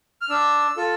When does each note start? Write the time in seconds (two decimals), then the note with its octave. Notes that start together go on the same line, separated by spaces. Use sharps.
0.21 F6
0.30 D4 E6
0.77 F4 A4